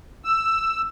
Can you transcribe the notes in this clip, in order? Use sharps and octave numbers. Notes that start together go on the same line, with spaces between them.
E6